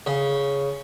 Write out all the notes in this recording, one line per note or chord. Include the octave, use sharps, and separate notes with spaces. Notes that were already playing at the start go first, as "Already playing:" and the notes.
C#3